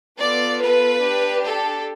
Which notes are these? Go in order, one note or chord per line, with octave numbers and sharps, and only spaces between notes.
B3 F4 A4 D5
B4
D4 G4
A4